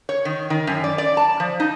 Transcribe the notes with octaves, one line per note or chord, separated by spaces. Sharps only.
C#5
D#3
D#3
F#2
D5
D5
A5
F3
D#4